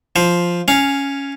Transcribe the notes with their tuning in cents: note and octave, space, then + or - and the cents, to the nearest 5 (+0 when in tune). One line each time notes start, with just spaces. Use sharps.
F3 +0 C5 +0
C#4 +0 F5 +0